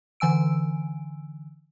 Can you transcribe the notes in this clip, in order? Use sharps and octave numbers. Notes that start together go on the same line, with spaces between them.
D3 E3 G#5 E6 D7